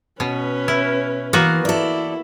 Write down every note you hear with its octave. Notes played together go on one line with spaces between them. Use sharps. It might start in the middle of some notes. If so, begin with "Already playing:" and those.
B2 C#4 B4
E4
E3 A#3 B3 F#4
E4 A4 D5